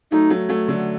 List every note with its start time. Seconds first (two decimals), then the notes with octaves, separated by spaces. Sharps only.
0.11 F#3 A3 D#4
0.30 F#3 A3
0.49 F#3 A3
0.68 D3 F#3